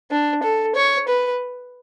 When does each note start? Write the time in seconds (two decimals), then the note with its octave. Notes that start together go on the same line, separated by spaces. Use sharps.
0.10 D4
0.43 A4
0.75 C#5
1.08 B4